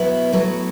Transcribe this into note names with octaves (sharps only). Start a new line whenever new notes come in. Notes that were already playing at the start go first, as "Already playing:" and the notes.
Already playing: B2 F#3 B3 E4
A2 F#3 B3